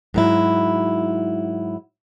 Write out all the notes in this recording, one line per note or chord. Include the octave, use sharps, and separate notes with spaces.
G#2 F#3 E4